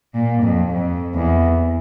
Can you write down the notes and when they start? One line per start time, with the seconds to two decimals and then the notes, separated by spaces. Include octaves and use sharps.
0.14 A#2
0.43 F2
0.72 F2
1.15 E2